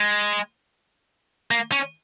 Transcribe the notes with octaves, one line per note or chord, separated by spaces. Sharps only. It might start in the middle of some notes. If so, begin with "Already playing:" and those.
Already playing: G#3
A#3
C#4